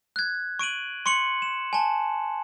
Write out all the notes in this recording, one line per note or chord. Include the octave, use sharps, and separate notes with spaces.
F#6 G#6
C#6 D7 D#7 F#7
C6 C#6 C#7 F#7
E7
G#5 A5